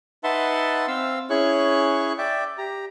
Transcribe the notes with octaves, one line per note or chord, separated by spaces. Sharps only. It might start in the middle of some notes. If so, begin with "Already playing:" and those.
D#4 B4 E5 F#5 A5 C6
C4 F5 E6
C#4 E4 G#4 C#5 C#6 F#6
D5 E5 G5
G4 A#5